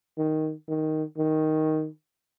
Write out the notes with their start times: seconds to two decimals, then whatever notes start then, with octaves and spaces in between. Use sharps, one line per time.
0.18 D#3
0.68 D#3
1.18 D#3